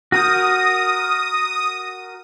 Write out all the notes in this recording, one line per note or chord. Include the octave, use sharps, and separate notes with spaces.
F#4 A#4 D#6 G6